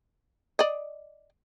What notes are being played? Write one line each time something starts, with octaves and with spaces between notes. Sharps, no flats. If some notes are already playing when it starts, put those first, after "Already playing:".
D5 D#5